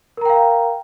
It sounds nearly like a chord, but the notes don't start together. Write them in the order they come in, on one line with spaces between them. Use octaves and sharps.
A#4 A#5 G5 F5